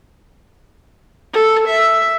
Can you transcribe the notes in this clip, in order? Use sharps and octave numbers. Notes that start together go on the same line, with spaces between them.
A4
E5